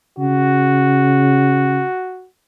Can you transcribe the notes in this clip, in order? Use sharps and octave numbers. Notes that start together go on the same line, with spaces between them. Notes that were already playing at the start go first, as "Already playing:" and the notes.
C#3 F#4